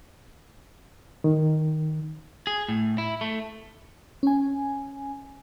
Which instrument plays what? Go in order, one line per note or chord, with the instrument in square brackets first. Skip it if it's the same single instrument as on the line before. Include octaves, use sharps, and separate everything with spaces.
[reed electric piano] D#3
[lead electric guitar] G#4
A2
E4
A3
[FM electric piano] C#4 G#5